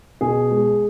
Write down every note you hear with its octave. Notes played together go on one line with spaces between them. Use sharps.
B2 G#4
G#3